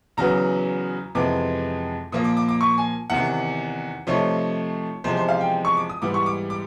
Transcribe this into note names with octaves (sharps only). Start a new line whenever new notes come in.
E2 C#3 F#3 B3 A#5
F2 C3 E3 G#3 B3 D6
A#2 F3 A#3 D#6
D6
D6
D6
C#6
G#5
E2 C3 D#3 F#5
C3 F3 A3 C4 D#4 C#5
E2 C3 F3 G#3 C4 C5
C5
F5
G5
C#6
D6
D#6
G#2 E3 G3 B3 D6
C#6
D6
D6